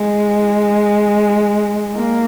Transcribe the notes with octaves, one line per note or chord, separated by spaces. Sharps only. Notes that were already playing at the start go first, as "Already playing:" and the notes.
Already playing: G#3
A#3